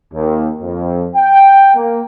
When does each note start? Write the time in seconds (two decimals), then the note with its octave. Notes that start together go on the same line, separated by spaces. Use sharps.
0.14 D#2
0.62 F2
1.15 G5
1.75 A#3